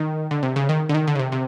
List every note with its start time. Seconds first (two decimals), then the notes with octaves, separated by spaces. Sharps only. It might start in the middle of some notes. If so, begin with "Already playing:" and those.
Already playing: D#3
0.31 D3
0.43 C3
0.56 C#3
0.69 D#3
0.89 D3
0.94 D#3
1.07 D3
1.15 C#3
1.19 C3
1.32 C3